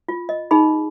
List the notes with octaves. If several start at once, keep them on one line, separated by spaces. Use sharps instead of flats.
F4
D#5
D#4 G#4 B5